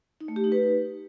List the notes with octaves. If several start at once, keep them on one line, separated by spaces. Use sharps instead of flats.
D#4
A3
G4
D#4
B4